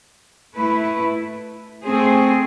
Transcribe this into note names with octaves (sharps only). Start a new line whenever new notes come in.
A3 E4 B4
A3 C4 G#4 C5